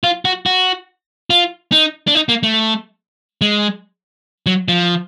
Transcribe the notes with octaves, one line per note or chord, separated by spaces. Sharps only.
F4
F#4
F#4
F4
D#4
D4
D#4
A#3
A3
G#3
F#3
F3